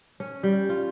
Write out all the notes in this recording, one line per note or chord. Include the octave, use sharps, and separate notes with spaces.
C#4
G3
F4